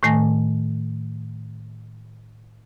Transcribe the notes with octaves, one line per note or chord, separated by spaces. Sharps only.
A2 D#3 A3 G#5 A#6